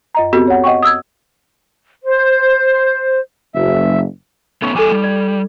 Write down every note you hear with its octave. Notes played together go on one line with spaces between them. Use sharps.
F#2 D#5 A#5
B3 C4 F#4 G4 A4
C#5 F#5
D#5 F#5 G5 C#6
D#6 E6 G#6
C5
F#1 E5
A3 B3 C#4 D#4 C#6
E2 G3 A4 G#5 D6
G3 D#4
D5